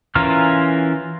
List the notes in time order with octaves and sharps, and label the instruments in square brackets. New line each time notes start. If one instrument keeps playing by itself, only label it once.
[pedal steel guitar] E3 C#4 F4 A#4 F6